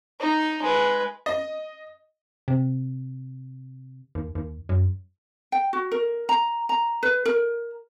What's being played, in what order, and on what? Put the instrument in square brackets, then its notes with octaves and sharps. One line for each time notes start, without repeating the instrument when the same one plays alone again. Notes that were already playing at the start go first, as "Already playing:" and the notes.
[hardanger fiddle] D#4
G#3 B4
[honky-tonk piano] D#5
[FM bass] C3
D#2
D#2
F#2
[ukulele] G5
F#4
A#4
A#5
A#5
B4
A#4